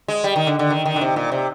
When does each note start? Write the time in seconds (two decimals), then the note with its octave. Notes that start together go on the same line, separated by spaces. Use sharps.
0.08 G#3
0.24 G3
0.36 D#3
0.47 D3
0.59 D3
0.70 D#3
0.86 D#3
0.96 D3
1.01 C3
1.16 A#2
1.32 C3